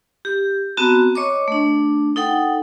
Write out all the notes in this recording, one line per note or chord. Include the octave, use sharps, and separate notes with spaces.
G4
B3 C4 F#4 A5 A#5
C#5 D#5 C#6 D6
A3 D4
D#4 A4 F#5 G5